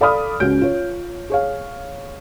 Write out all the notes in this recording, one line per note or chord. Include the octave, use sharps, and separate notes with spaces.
A4 D5 F5 B5 D#6 F6
C#2 C#4 F#4 G6 D7
F4 C#5
G#4 C#5 F5